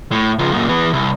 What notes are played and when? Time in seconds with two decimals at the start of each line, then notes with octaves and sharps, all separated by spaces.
0.12 A2
0.39 C#2 F3
0.53 F#2 A#2
0.69 E3 B3
0.93 C2